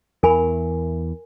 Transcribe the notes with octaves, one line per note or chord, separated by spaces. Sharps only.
E2 E3 A#4 G#5 B5